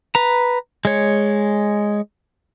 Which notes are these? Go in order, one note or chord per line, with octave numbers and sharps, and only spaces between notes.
B4 A#5
G#3 C#5